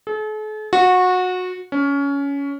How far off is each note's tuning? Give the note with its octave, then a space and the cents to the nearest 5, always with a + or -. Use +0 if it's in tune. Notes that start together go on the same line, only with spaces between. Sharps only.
A4 -45
F#4 -20
C#4 +20